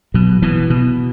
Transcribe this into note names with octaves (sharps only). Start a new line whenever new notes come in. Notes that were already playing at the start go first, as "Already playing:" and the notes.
B2 F#3
B2 E3
B2